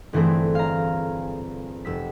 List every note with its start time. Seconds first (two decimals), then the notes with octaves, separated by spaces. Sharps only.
0.13 G1 E3 A3 C4 G#4
0.55 F5 A#5
1.85 F1 E6 B6